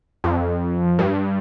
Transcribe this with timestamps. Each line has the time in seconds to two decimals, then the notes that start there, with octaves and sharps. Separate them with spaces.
0.24 F2
0.99 G2